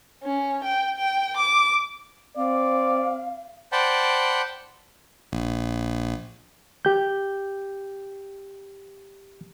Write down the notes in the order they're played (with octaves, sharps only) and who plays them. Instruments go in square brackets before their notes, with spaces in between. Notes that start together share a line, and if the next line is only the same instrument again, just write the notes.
[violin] C#4
G5
G5
D6
[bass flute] C4 [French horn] D5 [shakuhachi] F5
[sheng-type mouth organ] C5 D5 F#5 G5 A5 B5
[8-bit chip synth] A#1
[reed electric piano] G4 G6